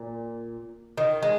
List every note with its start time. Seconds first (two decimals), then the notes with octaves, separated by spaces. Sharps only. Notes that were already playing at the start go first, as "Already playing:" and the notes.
Already playing: A#2
0.98 D#3
1.23 G#3